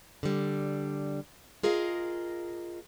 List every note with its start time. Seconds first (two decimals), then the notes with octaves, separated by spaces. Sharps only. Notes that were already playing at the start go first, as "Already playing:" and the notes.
0.23 D3 G3
1.63 F4 G#4 A#4 D#5 F5